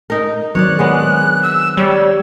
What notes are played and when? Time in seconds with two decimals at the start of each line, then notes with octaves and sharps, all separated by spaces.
0.10 D#4 A#4
0.55 D#3 F#3 C4 C#5 D5 F#6
0.79 G#3 B3 D4 G#4 C#5
1.43 E6
1.77 G3 C#5